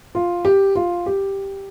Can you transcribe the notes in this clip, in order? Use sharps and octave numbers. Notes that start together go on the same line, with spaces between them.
F4
G4
F4
G4